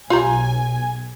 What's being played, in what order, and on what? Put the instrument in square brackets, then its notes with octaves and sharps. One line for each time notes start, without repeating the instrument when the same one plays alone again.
[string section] B1 G#5 [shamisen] F4 G4 A#5